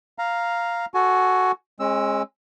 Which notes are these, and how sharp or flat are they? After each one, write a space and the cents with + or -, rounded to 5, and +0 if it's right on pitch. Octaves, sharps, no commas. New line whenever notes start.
F5 +0 A#5 +0
F#4 +0 A4 +0 G#5 +25
G#3 +0 C#4 -40 E6 +0